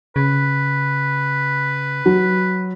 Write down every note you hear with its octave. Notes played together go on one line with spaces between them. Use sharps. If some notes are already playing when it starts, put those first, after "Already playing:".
C#3 B4
F#3